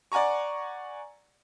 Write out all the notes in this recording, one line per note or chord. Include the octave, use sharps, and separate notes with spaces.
D5 F#5 G#5 A#5 C#6